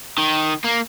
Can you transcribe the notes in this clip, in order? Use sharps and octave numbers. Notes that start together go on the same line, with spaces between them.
D#3
A#3